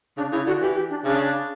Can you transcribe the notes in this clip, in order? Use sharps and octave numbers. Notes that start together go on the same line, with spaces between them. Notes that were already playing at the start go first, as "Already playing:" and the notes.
C#3 D4
C#3 E4
D3 F#4
E3 G4
G4
D4
C#3 D4